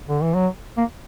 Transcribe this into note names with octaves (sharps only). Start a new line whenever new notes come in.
D3
E3
F#3
A#3